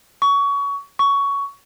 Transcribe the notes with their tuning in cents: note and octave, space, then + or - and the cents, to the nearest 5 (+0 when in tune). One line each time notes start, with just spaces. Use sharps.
C#6 +25
C#6 +15